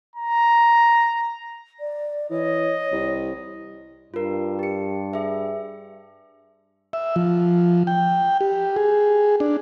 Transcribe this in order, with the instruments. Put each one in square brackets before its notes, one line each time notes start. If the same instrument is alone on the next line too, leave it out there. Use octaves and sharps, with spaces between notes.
[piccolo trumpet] A#5
[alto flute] D5
[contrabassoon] E3 [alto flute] C#5 [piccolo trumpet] D#5
[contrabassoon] C2
[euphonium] G2 [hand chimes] F4 A#4
[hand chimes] G4 C#7
G#4 E5
[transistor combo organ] E5
F3
G5
G4
G#4
D4